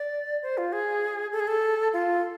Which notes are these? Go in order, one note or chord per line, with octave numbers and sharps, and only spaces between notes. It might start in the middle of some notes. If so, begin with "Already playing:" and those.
Already playing: D5
C5
F4
G#4
A4
G#4
A4
F4